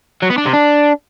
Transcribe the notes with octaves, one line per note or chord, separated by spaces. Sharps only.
F#3
B3
D4
C3
D4